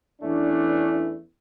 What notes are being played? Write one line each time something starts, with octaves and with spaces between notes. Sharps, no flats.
E2 E3 A3 C#4 D4